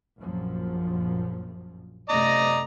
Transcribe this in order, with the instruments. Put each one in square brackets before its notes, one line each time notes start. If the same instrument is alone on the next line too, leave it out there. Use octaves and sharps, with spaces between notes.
[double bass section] A#1 F#2 F3
[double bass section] F#2 C3 A3 [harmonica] D5 D#5 A#5